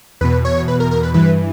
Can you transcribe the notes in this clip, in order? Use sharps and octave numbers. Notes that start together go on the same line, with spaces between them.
E2 B2 B4
C#5
B4
A#4
A#4
B4
G2 E3 B4